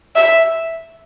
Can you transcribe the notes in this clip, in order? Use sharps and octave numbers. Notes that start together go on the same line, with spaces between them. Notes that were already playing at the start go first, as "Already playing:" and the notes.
E5